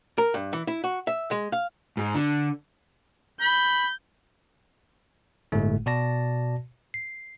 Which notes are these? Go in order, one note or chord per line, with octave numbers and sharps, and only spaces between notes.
A#4
G2
E3
E4
F#4
E5
G#3
F5
G#2
D3
B5 G6
G1 A2 G#3 A3
B2 F#4 D5 A5 A#6
C7